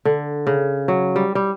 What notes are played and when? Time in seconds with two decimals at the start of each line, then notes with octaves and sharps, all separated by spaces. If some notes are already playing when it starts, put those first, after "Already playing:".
0.05 D3
0.47 C#3
0.88 F#3
1.16 G3
1.35 G3